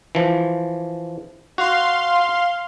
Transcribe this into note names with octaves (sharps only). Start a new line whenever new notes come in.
E3 F3
F#4 F5 C6